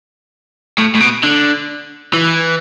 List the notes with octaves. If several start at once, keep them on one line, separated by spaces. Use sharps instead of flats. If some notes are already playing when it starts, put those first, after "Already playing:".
A2
A2
B2
D3
E3